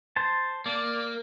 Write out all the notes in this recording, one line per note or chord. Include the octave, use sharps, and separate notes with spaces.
C5 A5
A#3 D5